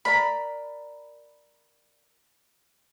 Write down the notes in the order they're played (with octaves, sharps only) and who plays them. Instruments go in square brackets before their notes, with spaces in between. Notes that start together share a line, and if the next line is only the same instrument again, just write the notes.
[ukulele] A#4 D5 A#5 [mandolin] B5